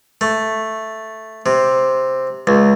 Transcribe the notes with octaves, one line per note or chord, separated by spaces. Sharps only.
A3
C3
C#2